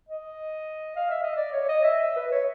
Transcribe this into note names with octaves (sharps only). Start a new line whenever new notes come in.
D#5
F5
E5
D#5
D5
C#5
D#5
E5
E5
B4
C#5